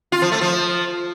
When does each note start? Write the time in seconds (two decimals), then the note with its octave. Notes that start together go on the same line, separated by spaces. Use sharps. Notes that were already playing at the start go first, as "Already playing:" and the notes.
0.12 F4
0.22 F3
0.32 A3
0.41 F3